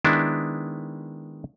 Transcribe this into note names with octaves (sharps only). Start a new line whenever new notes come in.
D#3 G#3 B3 D4 E4